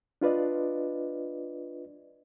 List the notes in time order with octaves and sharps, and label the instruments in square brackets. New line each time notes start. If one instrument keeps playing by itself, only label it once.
[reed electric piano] D4 F4 B4 D5 D#5